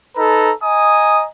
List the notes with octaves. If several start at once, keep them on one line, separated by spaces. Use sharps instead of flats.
D#4 A4 B4 A#5
D#5 G#5 A#5 D#6